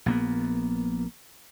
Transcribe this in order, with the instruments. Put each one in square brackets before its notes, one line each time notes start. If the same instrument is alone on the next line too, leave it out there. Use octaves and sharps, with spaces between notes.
[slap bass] A#1 A#3 B3